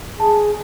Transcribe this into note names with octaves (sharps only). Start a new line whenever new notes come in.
G#4 A5